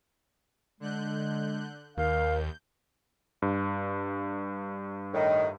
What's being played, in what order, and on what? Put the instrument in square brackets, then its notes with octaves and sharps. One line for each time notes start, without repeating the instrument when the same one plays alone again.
[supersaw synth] D3 F#6 G6 [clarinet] G#3
[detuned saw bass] D#2 [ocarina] A#4 [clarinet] F5 [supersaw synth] G6
[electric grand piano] G2
[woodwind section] A2 D#3